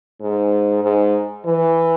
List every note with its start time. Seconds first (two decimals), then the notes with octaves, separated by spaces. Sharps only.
0.21 G#2
0.83 G#2
1.45 E3